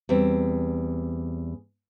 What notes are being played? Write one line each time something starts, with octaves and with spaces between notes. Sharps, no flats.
E2 G3 C4